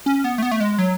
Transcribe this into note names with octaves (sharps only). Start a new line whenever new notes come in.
C#4
B3
A3
B3
A3
G#3
F#3